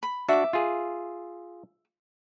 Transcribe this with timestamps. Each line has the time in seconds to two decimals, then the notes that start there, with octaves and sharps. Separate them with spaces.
0.03 B5
0.29 D4 F#4 E5 D6
0.53 F4 G#4